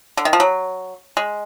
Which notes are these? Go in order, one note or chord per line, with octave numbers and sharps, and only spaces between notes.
D3
D#3
F3
F#3
G#3